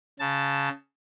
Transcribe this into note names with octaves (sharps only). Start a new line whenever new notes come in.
C#3 A5